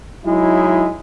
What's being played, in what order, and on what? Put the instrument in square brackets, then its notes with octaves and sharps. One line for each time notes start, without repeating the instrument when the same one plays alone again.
[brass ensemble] F#3 G#3 D#4 E4